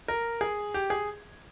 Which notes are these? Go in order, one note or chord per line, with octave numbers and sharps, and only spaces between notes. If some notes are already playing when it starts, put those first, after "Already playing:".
A#4
G#4
G4
G#4